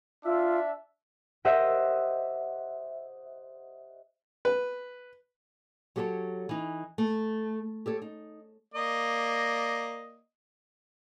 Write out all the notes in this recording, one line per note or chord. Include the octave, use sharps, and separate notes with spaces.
D4 F4 E5
G4 C5 D#5 E5 F#5
B4
F#3 G4 A4 B4 C#5
E3 D#4
A3
G4 A4 C#5
D#4
A#3 D5 D#5